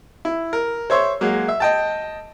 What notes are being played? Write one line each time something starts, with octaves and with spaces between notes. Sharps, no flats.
E4
A#4
C5 C#5 E5 C6 C#6
F#3 G#3 A#3
E5
D#5 G5 A5